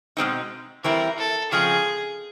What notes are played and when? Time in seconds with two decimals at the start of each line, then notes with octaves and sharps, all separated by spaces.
0.17 B2 G#3 C4 D#4
0.84 E3 G3 C4 E4 A#4
1.18 A4
1.52 C#3 F3 G#3 C4 G#4